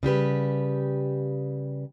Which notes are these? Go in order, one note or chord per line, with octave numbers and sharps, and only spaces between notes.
C#3 G3 G4 B4